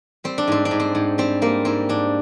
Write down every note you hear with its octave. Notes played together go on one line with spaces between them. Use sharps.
G3 C4
D4
G#2 C4
D4
G#2
C4
G#2
G3 C4
G3 A#3
G#2 C4
G#2 D4